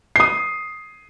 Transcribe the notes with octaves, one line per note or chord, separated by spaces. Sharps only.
D#6 C7